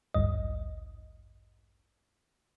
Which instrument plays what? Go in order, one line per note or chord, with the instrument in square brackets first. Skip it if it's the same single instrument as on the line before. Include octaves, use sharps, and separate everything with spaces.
[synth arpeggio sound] A1 D2 G2 D#5